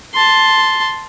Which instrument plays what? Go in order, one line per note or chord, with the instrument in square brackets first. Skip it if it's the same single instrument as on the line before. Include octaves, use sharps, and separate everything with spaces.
[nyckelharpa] A5 C6